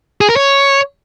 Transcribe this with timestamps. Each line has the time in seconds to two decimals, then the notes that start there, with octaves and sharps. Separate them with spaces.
0.21 G#4
0.29 A#4
0.37 C#5